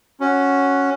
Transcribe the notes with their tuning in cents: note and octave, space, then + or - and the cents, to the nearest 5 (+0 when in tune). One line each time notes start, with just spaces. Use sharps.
C#4 +0 F#4 -5